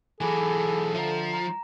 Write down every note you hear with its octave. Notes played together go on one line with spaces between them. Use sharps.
E3 F#3 G#4 A4 G#5 B5 D6
D3 F3 E5 A#5
A#5